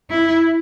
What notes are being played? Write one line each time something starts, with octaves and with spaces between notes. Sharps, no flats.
E4